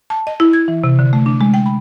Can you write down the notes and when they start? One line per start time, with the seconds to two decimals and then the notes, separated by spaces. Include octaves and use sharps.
0.10 A5
0.27 D#5
0.40 E4
0.53 G#6
0.68 E3
0.84 C3
0.99 D3
1.13 A3
1.26 D4
1.41 G#3
1.54 G5
1.66 B5